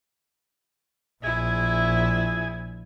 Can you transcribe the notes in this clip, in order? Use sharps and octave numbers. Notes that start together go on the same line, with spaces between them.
A#1 E4 G#4 G#5